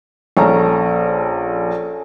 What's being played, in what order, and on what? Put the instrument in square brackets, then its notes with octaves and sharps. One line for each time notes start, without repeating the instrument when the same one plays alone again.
[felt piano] A#1 [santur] C#4 A4 A#5